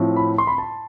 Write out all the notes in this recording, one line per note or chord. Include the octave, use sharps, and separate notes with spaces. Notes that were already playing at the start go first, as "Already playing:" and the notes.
Already playing: A2 F3 C4
B5
C6
B5
A5